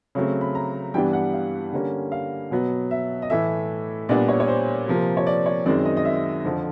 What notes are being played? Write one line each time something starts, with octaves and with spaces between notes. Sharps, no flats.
C#3 F#3 A3 C4
B5
A#5
G2 E3 G3 B3 D4 G5
F#5
F5
D3 G3 A#3 C#4
F5
B2 F#3 B3
E5
D#5
A2 E3 A3 E5
A#2 G3 B3 D4 D5
C#5
C#5
C5
C3 F3 A#3
C#5
D5
C#5
F#2 D#3 G#3 C4 D5
D#5
D#5
E5
F2 D3 F3